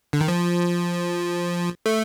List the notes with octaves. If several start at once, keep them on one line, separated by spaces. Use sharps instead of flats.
D3
D#3
F3
A3